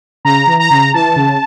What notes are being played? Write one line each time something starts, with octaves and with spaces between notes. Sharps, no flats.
C#3 A#5
E3
A#5
C#3
E3 A5
C#3